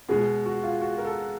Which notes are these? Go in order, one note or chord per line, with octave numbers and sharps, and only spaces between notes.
B2 G#3 G#4
F#4
F4
F#4
A#4
A4